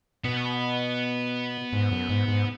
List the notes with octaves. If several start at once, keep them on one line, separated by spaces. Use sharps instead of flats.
B2 B3
G#2
F#2
G#2
G#2